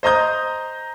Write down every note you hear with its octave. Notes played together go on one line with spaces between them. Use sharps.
C5 D#5 A#5 D#6 G6